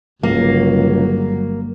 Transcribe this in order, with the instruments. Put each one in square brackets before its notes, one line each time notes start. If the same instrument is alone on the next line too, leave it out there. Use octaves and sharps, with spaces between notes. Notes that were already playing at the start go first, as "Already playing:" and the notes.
[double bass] G1 F#3 [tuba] C#2 [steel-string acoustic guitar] A#3